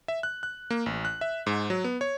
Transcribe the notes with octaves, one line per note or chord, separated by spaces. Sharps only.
E5
F#6
F#6
A#3
A1
F#6
E5
G#2
F#3
B3
C#5